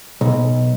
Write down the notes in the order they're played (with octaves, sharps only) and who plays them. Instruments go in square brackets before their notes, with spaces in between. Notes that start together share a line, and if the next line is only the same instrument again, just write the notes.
[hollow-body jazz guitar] B1